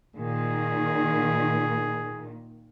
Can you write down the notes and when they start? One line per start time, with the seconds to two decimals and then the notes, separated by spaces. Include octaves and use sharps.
0.16 A#2 D#3 G#4